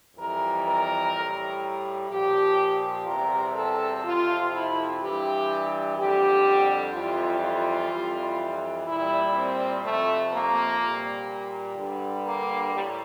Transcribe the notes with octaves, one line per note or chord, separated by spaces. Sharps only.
F2 E3 G3 A#4
A#4
A2 G3
A#2 F3 G4
E2 C3 G3 A#4
A4
F2 C3 F3 F4
E4
G2 E3 G3 G4
F2 D3 G3 G4
F2 E3 G3 F4
F4
F2 E3 G3
A#2 G3 E4
C4
F2 C3 F3 A3
A#3
A#2 G3
G2 D3 G3
A#3
A2 G3